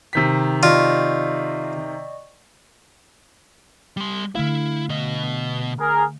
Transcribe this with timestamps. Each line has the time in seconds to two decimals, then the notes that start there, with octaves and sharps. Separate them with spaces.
0.13 C3 D#3 B6
0.63 F4 D5 D#5 C#6
3.97 G3 C6
4.35 D3 A3 E4 F5
4.89 B2 D#5
5.80 G#4 A#4